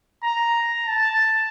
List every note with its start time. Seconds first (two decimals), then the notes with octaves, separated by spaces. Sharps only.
0.23 A#5
0.86 A5